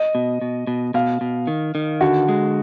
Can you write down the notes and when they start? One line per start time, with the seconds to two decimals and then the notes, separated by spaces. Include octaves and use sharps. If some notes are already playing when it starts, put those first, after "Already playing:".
Already playing: D#5
0.15 B2
0.42 B2
0.67 B2
0.94 B2 F5
1.21 B2
1.47 D#3
1.75 D#3
2.01 D3 F#4
2.29 G#3